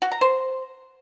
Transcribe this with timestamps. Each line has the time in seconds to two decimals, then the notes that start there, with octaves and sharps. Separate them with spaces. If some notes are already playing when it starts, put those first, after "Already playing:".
0.02 F#4
0.12 A#5
0.21 C5